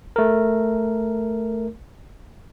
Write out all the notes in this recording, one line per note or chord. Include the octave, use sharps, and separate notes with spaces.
A3 A#4